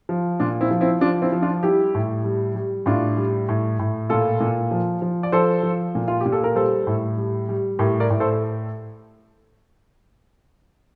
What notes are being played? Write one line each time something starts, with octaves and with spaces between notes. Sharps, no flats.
F3
A#2 D4 F4
C4 E4
F3
C4 E4
F3 D4 F4
C4 E4
F3
D4 F4
G3 E4 G4
A2
G3
G3
A2 D4 F4
G3
A2
A2
A#2 F4 A4
A#2
F3
F3
D5
F3 A4 C5
F3
A#2
F4
G4
A#2
A4
A#4
G3 A4 C5
A2
G3
G3
A2 G4 A#4
A#4 D5
A2
A4 C5
A4